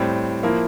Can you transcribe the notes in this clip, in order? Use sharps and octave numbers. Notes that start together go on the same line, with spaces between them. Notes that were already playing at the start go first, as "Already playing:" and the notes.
Already playing: A2 G3 C4
F3 A#3 E4